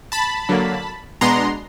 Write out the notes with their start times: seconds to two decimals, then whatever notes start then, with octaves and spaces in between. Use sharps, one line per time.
0.12 A5 B5
0.49 D3 F#3 A#3
1.21 B2 G#3 B3 D4 A#5 C6